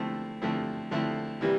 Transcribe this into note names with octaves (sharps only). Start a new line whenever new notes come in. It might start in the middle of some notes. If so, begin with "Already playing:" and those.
Already playing: D3 F3 A3 C4 E4
D3 F3 A3 C4 E4
D3 F3 A3 C4 E4
C3 E3 G3 A#3